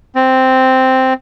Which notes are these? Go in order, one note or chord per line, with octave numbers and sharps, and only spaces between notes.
C4